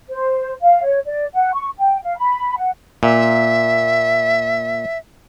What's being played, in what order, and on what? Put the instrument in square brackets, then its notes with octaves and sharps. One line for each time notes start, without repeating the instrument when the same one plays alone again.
[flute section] C5
F5
C#5
D5
F#5
C#6
G5
F5
B5
F#5
[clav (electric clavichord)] A#2 [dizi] E5